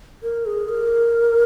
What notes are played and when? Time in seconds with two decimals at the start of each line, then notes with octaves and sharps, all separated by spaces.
0.23 A#4
0.46 G#4
0.69 A#4